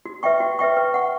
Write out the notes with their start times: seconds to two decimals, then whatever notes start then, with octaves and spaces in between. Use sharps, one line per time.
0.05 F#4
0.23 B4 E5 G5 C#6
0.40 F#4
0.59 B4 E5 G5 C#6
0.77 B4
0.94 F#5 C#6